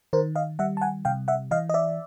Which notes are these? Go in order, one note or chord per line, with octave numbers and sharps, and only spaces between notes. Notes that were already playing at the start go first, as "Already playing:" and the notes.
D#3 A#4 C5
D#5 F5
G3 E5 F#5
A5
F#5 G#5
C3 F5 G5
E5 F#5
E3 D#5 F5
D#5
D5 E5